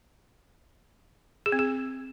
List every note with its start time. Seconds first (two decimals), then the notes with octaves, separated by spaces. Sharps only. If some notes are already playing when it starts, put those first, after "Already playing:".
1.46 G#4
1.52 C4
1.59 G#4